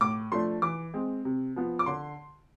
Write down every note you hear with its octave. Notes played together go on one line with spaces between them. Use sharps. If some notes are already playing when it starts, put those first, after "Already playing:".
A2 D6
F3 A3 D4 C6
E3 D6
G#3 C4
C3
F3 B3
D6
D3 C6